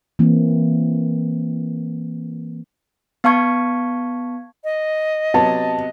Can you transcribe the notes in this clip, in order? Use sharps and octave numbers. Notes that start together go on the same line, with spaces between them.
E3 A#3 C4
B3 F5 A5 C#6 G#6
D#5
C3 F#3 B3 A5